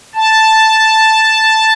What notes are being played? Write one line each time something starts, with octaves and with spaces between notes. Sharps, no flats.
A5